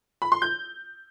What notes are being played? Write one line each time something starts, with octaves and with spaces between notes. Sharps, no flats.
B5
C6
G6